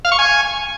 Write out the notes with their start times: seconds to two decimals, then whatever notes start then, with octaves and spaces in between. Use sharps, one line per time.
0.05 F5
0.12 C#6
0.19 G#5